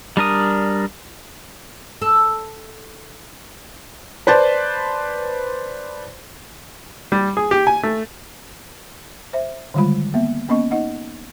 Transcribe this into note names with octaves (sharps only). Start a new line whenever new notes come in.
G3 D4 A#4 D#6
A4
B4 C5 D5 A5
G3
G#4
G4
G#5
A3
C5 E5
D3 D#3 G3 G#3 F4 B5
A#3 B3 E5
A#3 B3 C#4 D#5 C#6
D#4 D#5 F#5